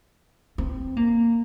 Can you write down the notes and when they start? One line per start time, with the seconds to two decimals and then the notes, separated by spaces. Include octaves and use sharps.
0.58 C4
0.97 A#3